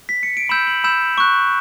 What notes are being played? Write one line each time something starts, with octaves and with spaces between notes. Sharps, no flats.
B6
C#7
D7
B5 E6 G6 E7
F#7
B5 E6 G6 E7
C#6 F#6